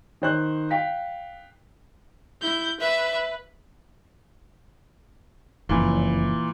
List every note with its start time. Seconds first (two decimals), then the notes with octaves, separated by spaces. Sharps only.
0.22 D#3 C5 F#6
0.71 F5 G5 B6
2.41 E4 G6
2.80 B4 E5
5.69 F#1 F2 A#2 E3